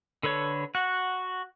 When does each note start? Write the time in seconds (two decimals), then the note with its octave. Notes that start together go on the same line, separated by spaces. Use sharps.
0.23 D3 A4 B4 C#5
0.75 F#4 F#5